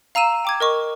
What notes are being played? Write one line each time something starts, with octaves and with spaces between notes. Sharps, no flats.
F5 A#5 E6 D#7 E7
G5 D6 G#6
A#4 D#5 C#6 D6